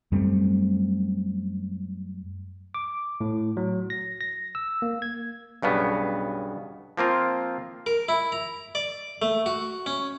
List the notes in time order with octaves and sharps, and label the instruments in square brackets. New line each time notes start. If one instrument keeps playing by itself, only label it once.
[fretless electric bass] F#2 G3 A3 C4
[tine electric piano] D6
A2
F#3
A#6
A#6
E6
A#3
G#6
[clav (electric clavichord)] B1 G2 C#3 B3
F3 A#3 C4 F4
[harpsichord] A#4
E4
A#5
D5
A3
F#4
C#4